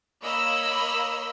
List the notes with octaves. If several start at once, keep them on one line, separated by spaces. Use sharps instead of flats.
A#3 C#5 D#5 B5 E6